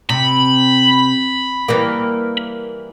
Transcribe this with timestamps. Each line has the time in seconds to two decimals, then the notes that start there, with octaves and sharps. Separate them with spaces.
0.09 C3 B5
1.68 E3 G3 A#3